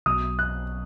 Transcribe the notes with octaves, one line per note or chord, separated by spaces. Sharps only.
B1 B2 F#3 D#6
F#6